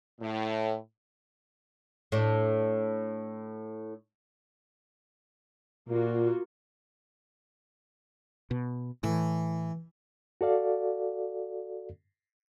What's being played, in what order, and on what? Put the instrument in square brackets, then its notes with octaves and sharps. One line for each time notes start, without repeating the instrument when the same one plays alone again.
[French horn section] A2
[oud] A2 D4
[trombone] A#2 [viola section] A#3 F4 F#4
[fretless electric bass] B2
[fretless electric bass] A2 [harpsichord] E3
[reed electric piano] F#4 A4 D5 F5